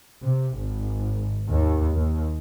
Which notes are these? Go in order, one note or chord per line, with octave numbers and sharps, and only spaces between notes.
C3
G#1
D#2
D#2